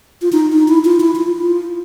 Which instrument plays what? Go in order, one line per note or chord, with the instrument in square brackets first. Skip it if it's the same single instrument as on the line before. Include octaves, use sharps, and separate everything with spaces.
[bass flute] F4
D#4
D#4
E4
F4
E4
F4
F4